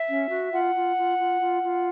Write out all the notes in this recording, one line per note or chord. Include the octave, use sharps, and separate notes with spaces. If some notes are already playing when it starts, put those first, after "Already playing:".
Already playing: E5
C#4
F#4
F4 F#5
F4
F4
F4
F4
F4